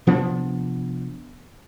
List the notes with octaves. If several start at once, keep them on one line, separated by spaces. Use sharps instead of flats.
C3 F3 B3 D4